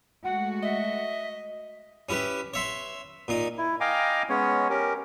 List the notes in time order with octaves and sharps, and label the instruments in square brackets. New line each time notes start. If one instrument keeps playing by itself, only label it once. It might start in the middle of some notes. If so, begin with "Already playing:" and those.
[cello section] G#3 A3 F#4 [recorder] F#5
[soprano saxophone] D#5 [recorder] E5
[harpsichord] C#4 E4 G4 B4
C#5 E5 C6
A#2 D#4
[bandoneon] E4
D#5 F5 G5 G#5 A#5 D6
G#3 B3 C#4 C#5
C#4 G4 A#4